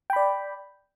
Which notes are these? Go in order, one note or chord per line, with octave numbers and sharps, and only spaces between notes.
D5 G5 B5